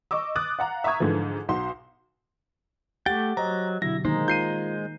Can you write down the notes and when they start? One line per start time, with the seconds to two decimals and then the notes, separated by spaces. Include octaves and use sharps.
0.11 D#5 C#6 D6 E6
0.36 D6 D#6 F#6 A6
0.59 F5 F#5 A#5
0.84 E5 A#5 C#6 D#6 G#6
1.00 G#2 D3 E3 F3
1.49 B1 F#4 C6
3.06 A3 G4 F#5 G5 A6
3.37 F#3 C5 D#5 A#5
3.82 B2 D3 F#3 E4 A#6
4.05 D#3 G#3 A#3 D#4 C5
4.28 F4 A#5 G6 C7 D#7